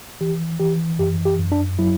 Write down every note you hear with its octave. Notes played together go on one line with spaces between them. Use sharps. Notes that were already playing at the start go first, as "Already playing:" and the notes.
E3 G4
E3 G4
F#2 G4
G4
F#2
D4
F#3 E4